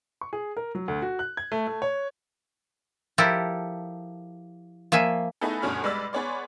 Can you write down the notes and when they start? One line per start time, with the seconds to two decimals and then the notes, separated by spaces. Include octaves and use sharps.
0.21 C#6
0.33 G#4
0.57 A#4
0.75 F#3
0.88 D2
1.02 F#4
1.19 F#6
1.37 G#6
1.52 A3
1.67 A3
1.82 C#5
3.18 F3 E4 G4 A4 A#4
4.92 F3 A#3 E5 G#5
5.41 A3 B3 D#4 E4 G#4 A4
5.62 D2 G2 B2 C#4 G#4 F6
5.83 G3 G#3 B4 D5 E6 B6
6.13 B3 G#4 C#5 D5 C6